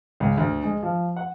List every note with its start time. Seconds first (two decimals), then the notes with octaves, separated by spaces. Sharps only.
0.20 C#2
0.38 D2
0.63 G#3
0.83 F3
1.16 F#5